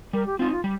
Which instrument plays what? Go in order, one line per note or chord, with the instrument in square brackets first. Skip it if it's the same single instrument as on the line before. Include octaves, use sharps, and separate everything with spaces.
[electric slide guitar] G3 [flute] A#4
[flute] G4
[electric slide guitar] C4 D#4 [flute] F4
[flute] F4
[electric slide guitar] G3